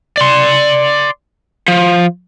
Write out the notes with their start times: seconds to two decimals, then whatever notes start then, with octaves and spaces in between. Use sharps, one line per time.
0.17 D5 C6
1.68 F3